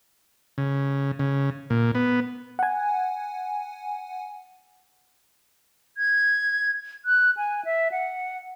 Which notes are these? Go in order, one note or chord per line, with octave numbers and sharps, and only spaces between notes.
C#3
C#3
A#2
B3
F#5 G#5
G#6
F#6
G#5
E5
F#5